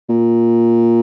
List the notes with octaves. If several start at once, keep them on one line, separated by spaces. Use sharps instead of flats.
A#2